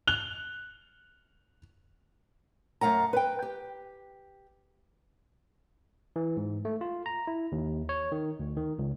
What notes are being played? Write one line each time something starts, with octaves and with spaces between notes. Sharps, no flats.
F#6 F7 G7
F#2 A3 F5 F#5 A#5
B4 G5
G4
E3
G#2
A3
F4
A#5
E4
D#2
C#5
D#3
D2
D#3
C#2